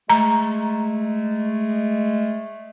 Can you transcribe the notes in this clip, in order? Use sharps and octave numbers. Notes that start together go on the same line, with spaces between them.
G#3 A3 A#5